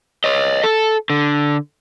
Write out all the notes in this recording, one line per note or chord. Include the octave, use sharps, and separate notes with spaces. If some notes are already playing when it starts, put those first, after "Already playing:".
C#5 D#5
A4
D3